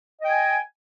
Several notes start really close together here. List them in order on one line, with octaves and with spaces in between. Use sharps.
D#5 G5 G#5